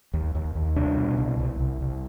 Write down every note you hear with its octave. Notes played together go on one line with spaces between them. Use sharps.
D#2
D#2
D#2
C2 D4
B2
C2
C2
C2
C2